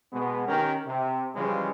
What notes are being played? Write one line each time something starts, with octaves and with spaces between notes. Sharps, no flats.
B2 G#3 B3
D#3 C#4 G4 A#4
C3
C#3 E3 F3 G3 G#3 C#4